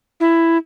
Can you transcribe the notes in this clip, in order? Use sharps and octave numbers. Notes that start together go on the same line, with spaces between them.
E4